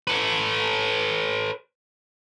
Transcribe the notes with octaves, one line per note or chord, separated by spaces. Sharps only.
A4 B4